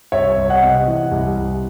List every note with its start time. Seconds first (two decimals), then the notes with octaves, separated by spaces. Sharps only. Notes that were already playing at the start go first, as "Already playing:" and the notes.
0.12 C2 C#5 E5
0.37 C2
0.49 D#5 F#5
0.63 C3
0.87 E3
1.11 C2
1.37 C2